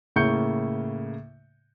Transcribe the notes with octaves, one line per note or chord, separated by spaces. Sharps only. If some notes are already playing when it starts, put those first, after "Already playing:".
A2 C#3 A#3 C#6 G6 C#7